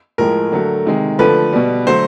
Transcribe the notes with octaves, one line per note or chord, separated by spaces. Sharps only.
A2 F3 G#3 A#4
D3 F#3 A3
C3 D#3 G#3
D3 F3 A3 B4
B2 G3
D3 F#3 A3 C5